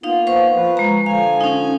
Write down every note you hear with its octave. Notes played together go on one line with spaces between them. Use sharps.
A#3 B3 D#4 F4 F5
C5 F5 C#6
F3 B4
G#3 A#5
D3 F3 F5 G#5
C#4 D#4